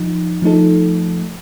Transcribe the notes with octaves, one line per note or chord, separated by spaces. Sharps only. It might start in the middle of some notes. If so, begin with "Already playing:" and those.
Already playing: F3 D#4
F3 A3 D#4 A4